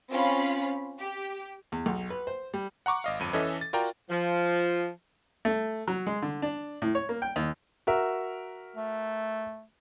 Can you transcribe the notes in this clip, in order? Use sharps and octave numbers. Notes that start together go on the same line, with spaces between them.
C4 C#4 F4 F5 B5
G4
E2
B1
B4
C5
G3
F#5 A#5 C#6 D6
G#1 D#5 F5
G1 F2 D#7
E3 C#4 A4 D#5 E5
A6
F4 F#4 A#4 D5 G5 A#5
F3
A3
F#3
G#3
D3
D4
A2
C#5
A#3
G5
D#2
F#4 A#4 E5
A3